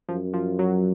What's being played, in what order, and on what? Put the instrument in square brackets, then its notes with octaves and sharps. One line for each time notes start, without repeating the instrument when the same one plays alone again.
[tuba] F#2 [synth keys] F3
[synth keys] F3
F#3